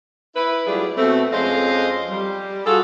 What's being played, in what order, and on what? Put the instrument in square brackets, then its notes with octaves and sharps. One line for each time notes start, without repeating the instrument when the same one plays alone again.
[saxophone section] E4 B4
F#3 G3 A3 D4 F4 G#4
B2 A3 C4
F2 G#3 C#4 C5 D#5 F5
G3
F4 F#4 G#4 A4